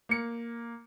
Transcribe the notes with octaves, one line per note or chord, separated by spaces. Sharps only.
A#3 C#7